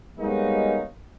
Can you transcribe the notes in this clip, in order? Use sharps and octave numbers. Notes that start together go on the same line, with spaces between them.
G3 G#3 A#3 B3 C#4 D#4